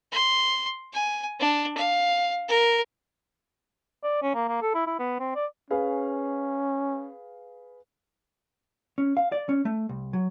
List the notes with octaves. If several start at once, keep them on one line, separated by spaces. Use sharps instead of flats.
C6
G#5
D4
F5
A#4
D5
C#4
A#3
A#3
A4
E4
E4
B3
C4
D5
C#4 G#4 B4 F5
C#4
F5
D5
C#4
A3
C2
F#3